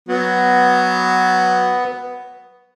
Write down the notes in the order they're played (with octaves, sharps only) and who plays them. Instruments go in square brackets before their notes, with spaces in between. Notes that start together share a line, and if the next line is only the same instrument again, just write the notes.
[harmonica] F#3 [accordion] B3